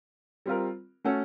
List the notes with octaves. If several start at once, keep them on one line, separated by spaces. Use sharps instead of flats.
G3 C4 F4 A#4
A3 C#4 F#4 A4